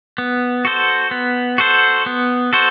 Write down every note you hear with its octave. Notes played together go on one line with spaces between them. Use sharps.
B3
F#4 A4 C5
B3
F#4 A4 C5
B3
F#4 A4 C5